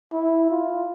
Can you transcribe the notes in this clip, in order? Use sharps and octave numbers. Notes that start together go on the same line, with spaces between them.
E4
F4